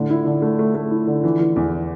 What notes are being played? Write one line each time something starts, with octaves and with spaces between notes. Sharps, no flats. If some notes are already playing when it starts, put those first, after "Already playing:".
Already playing: A2 D3
E4
D3
A3
A3
A3
E4
D3
E3
E3
E2